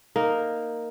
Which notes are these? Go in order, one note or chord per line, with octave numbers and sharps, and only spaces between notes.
A#3 D#4 A#4